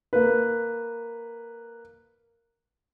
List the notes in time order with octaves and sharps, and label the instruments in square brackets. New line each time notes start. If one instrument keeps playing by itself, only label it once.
[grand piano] A#3 B4